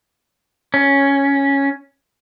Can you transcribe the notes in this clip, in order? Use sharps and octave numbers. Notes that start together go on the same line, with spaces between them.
C#4